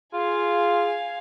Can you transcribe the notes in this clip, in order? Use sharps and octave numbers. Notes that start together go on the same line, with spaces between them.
F4 G#4 F5 G#5